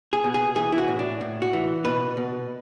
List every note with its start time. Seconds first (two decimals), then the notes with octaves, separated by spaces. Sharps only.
0.13 G#4
0.24 B2
0.34 G#4
0.55 E3 G#4
0.72 E4
0.78 F#4
0.88 A2
0.99 D4
1.21 A2
1.42 F#4
1.53 E3
1.85 B2 B4
2.17 B2